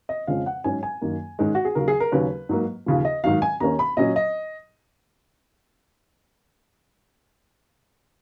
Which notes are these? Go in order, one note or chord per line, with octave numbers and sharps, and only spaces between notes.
D#5
F2 C#3 F3 G#3 C#4 F5
F#5
G#2 F#3 C#4 G#5
G#5
F#2 D#3 A#3
G#2 D#3 G#3 C#4
F#4
G#4
D#2 C#3 F#3 A#4
G#4
A#4
D#2 C#3 F#3 C#4 B4
G#2 F#3 A#3
D#2 C#3 F3
D#5
G#2 D#3 F#3 F5
G#5
D#2 D#3 A#3 C#4 A#5
B5
A#2 F#3 C#4 D#5
D#5